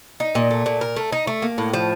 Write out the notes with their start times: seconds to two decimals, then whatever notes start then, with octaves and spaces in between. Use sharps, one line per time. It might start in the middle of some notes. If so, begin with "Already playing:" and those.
0.20 D#4
0.35 A#2
0.51 A3
0.66 A#2
0.81 A#4
0.96 A3
1.12 D#4
1.27 A3
1.42 A#3
1.58 A2
1.74 F3